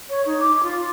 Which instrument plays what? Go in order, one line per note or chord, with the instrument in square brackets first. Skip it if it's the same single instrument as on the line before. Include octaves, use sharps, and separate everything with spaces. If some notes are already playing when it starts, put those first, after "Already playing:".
[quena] C#5
D#4
D6
F4